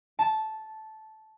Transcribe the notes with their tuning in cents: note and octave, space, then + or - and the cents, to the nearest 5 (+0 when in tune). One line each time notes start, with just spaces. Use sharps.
A5 -10